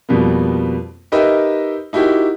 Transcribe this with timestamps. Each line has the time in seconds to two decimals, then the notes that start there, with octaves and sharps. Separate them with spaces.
0.09 F2 B2 G3 A#3 B3
1.12 D#4 G4 A#4 B4 D#5 E5
1.93 D#4 E4 F#4 G4 A#4